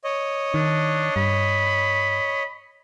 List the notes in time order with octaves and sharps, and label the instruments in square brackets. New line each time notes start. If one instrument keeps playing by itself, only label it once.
[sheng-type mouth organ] C#5 D#5
[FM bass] D#3 [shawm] D4
[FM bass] G2 [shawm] B5